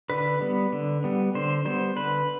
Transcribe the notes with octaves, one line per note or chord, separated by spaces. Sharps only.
D3 B4
G3 B3
D3
G3 B3
D3 C5
G3 B3 C5
D3 B4